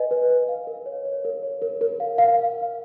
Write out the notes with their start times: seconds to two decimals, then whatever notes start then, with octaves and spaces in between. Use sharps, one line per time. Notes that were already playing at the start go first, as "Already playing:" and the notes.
Already playing: B4 D#5 G#5
0.11 B4
0.30 B4
0.48 F5
0.67 A#4
0.86 C#5
1.05 C#5
1.25 A#4
1.43 C#5
1.62 A#4
1.81 A#4
2.00 F5
2.18 F5